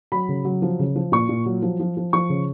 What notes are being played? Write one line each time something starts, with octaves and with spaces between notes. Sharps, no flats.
F#3 B5
C#3
F#3
F3
C#3
F3
A#2 C#6
A#2
F#3
F3
F3
F3
F3 C#6
C#3